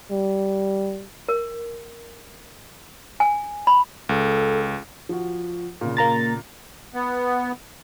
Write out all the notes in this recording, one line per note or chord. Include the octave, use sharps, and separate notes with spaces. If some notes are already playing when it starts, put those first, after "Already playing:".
G3
A#4
G#5
B5
C#2 A4
F3 F#4
A#2 C#3
A#3 A#5 A6
B3